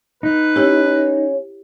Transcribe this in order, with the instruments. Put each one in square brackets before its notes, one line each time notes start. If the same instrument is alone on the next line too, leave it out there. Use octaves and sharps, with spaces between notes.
[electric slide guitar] D#4 [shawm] B4
[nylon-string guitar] C#4 [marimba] E4 G4